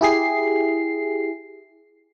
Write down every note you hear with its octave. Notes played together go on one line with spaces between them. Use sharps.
E4 G4 G#4 C7